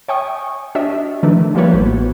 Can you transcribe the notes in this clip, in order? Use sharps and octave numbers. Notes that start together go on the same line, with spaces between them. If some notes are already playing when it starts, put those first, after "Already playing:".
C#5 E5 G5 G#5 C#6 D#6
D4 F#4 G4 C#5 D#5 E5
D#3 F3 A3 D4 E4 B4
F3 G3 A#3 F#4 B4 C#5
A1 B3 C5